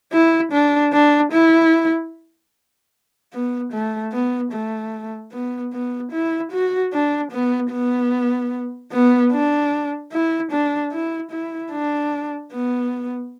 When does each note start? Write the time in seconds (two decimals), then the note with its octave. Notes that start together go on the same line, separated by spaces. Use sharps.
0.12 E4
0.52 D4
0.93 D4
1.33 E4
3.33 B3
3.72 A3
4.12 B3
4.52 A3
5.33 B3
5.73 B3
6.13 E4
6.52 F#4
6.93 D4
7.32 B3
7.72 B3
8.92 B3
9.32 D4
10.12 E4
10.52 D4
10.92 E4
11.31 E4
11.72 D4
12.52 B3